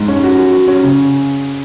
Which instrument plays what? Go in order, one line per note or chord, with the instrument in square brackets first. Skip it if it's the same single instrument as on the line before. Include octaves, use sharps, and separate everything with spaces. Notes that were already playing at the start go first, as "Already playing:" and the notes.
Already playing: [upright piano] G#2
C#4
F#4
F#3
F#4
C#4
C#3